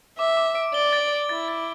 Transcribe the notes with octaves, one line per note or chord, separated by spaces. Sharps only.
E5 D6
D6
D7
D5 G7
A6
G7
E4 A6
A6